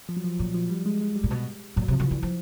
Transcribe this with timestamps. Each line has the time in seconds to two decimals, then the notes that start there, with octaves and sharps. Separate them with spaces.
0.09 F3
0.17 F#3
0.24 F3
0.39 A#2 F#3
0.54 F3
0.70 G3
0.86 G#3
1.01 G#3
1.15 G3
1.24 A#2
1.31 B2
1.76 A#2 F#3
1.88 C3
1.92 F3
2.00 C#3
2.07 D3 E3
2.23 F3